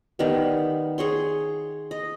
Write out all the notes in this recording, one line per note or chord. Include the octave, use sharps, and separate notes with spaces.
D#3 G3 B3
G#4 C#5 C6
D#5